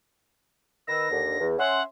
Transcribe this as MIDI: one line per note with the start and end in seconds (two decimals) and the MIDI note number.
0.88 1.08 51
0.88 1.08 71
0.88 1.08 88
0.88 1.46 94
1.11 1.37 39
1.11 1.37 50
1.40 1.55 40
1.58 1.81 61
1.58 1.81 76
1.58 1.82 78
1.58 1.81 84